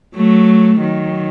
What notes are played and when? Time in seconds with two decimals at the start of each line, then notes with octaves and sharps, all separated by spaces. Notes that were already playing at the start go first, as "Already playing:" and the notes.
0.16 F#3 A3
0.81 D#3 F#3